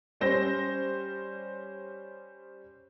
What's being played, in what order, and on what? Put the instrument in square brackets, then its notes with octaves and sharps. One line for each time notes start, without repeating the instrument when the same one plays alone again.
[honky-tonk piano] G3 C#4 C5 A#6